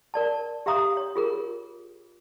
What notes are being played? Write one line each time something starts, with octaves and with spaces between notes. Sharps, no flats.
A#4 D5 A5
G4 E5 F5 A#5 D#6
C#5
F4 G#4 A#4